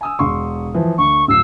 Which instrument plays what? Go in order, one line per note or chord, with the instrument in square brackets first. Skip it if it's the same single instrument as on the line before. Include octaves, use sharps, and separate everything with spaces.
[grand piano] G#5 D#6 E6
E1 C6 C#6
E3 F3
[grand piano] D2 [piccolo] C#6
[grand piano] D1 C7 [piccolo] E6